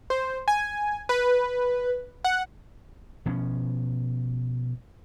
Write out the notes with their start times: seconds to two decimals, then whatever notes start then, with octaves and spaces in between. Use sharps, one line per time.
0.10 C5
0.48 G#5
1.09 B4
2.24 F#5
3.26 B2 F3 C#4